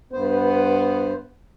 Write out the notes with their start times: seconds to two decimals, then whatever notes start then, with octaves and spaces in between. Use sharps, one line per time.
0.13 G2 B3 C5